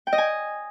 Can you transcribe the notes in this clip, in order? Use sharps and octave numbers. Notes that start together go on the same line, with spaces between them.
G5
D#5
G#5